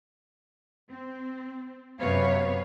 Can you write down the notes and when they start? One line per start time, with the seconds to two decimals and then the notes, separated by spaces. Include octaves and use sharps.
0.91 C4
2.00 F#2 C3 B3 B4 C#5 F5